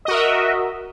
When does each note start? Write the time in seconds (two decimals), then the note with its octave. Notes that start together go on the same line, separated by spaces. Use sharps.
0.05 D#5
0.08 F#4
0.11 A#4
0.14 E5